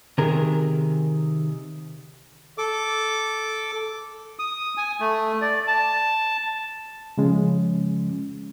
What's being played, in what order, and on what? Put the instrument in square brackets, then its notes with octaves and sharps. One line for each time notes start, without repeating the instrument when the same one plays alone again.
[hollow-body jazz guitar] C3 D#3 G#4 A#4 A#5
[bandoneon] A4 D6
[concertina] D#6
G#5
A3
D5
A5
[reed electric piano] C#3 F3 G#3 C#4